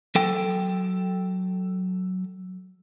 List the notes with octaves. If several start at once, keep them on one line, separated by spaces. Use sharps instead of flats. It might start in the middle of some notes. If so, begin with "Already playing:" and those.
F#3 A4 G5